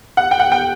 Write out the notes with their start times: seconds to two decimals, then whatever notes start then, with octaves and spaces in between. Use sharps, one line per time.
0.17 F#5
0.31 G5
0.40 F#5
0.52 G5